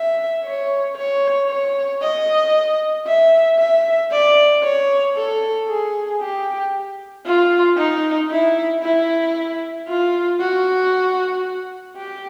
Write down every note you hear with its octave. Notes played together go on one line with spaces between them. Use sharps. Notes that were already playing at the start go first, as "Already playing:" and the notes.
Already playing: E5
C#5
C#5
C#5
D#5
E5
E5
D5
C#5
A4
G#4
G4
F4
D#4
E4
E4
F4
F#4
G4